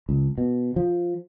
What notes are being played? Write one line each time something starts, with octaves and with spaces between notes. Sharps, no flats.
C#2
B2
F3